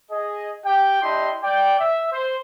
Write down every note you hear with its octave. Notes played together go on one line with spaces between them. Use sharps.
G#4 D#5
G4 G5
D4 E4 G4 D#5 C6
D5 G5
E5
C5